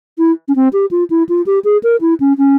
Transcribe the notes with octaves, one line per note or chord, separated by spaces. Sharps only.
E4
C#4
C4
G4
F4
E4
F4
G4
G#4
A#4
E4
C#4
C#4